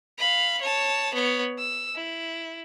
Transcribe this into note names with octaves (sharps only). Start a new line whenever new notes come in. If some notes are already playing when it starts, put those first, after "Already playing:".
F5 B5
C#5 A5
B3 C#5
E6
E4